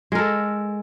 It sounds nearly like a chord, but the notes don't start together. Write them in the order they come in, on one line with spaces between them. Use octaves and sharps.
G#3 A#4 A4